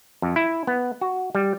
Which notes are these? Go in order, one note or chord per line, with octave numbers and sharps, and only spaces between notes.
F2
E4
B3
F#4
G3